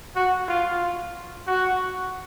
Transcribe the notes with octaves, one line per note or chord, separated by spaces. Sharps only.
F#4
F4
F#4